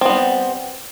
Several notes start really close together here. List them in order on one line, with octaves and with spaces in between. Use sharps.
C4 B3 G3